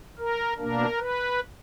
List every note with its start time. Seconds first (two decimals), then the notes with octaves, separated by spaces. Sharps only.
0.19 A#4
0.57 B2 A#3 D4 A#4
0.98 B4